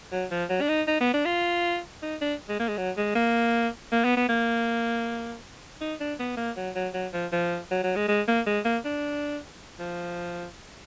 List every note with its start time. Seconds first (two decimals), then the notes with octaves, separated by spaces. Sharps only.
0.12 F#3
0.31 F3
0.50 F#3
0.61 D4
0.69 D#4
0.88 D#4
1.00 B3
1.14 D4
1.26 F4
2.02 D#4
2.21 D4
2.49 G#3
2.59 A#3
2.68 G#3
2.77 F#3
2.97 G#3
3.15 A#3
3.92 A#3
4.04 B3
4.17 B3
4.29 A#3
5.81 D#4
6.00 D4
6.19 B3
6.37 A#3
6.57 F#3
6.75 F#3
6.94 F#3
7.13 F3
7.32 F3
7.71 F#3
7.84 F#3
7.96 G#3
8.08 G#3
8.28 A#3
8.46 G#3
8.65 A#3
8.85 D4
9.80 F3